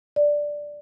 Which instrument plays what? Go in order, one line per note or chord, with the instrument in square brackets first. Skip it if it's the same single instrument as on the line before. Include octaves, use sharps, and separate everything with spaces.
[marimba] D5